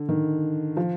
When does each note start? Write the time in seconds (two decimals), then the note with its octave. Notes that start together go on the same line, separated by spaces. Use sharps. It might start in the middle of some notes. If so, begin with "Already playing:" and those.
Already playing: D3
0.09 D#3
0.77 F3